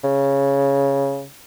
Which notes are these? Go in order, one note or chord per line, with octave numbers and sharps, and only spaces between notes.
C#3